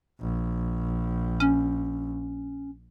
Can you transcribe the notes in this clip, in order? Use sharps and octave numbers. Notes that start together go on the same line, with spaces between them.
A#1
C#4